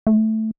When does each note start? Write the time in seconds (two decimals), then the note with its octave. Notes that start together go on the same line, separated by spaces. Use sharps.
0.07 A3